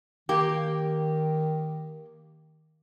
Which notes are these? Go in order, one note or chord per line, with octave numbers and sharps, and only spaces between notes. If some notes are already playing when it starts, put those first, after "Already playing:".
D#3 A#3 G4